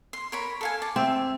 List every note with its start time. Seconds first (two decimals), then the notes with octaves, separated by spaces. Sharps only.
0.13 C6
0.32 A#4 C#5 B5
0.61 A4 F5 G#5
0.82 A5 D6
0.96 C4 E5